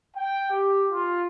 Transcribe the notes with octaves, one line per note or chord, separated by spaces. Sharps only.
G5
G4
F4